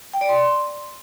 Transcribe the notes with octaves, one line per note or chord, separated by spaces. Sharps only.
G5
D5
C6